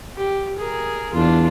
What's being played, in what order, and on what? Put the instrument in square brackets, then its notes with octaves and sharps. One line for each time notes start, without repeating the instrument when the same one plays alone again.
[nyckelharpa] G4
G#4 A#4
[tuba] E2 [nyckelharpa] D4 F4